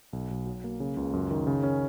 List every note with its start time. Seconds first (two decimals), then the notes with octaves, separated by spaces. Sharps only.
0.13 B1
0.31 B1
0.46 F#3
0.64 A#3
0.80 C#3
0.97 C#2
1.13 F#2
1.31 D#3
1.47 C#3
1.63 C#4